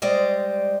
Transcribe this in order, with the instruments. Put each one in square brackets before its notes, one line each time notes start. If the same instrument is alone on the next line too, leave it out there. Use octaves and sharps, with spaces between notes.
[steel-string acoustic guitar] G3 G#3 C5 D5 D#5